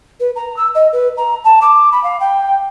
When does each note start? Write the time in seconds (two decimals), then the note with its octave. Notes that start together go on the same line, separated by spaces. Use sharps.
0.20 B4
0.36 A#5
0.57 E6
0.75 D#5
0.93 B4
1.17 A#5
1.44 A5
1.61 D6
1.92 B5
2.04 F5
2.20 G5